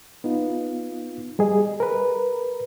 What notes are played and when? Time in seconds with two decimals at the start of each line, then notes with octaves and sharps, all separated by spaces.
0.24 B3 D#4 F4
1.39 G3 G#4 D#5
1.80 A#4 B4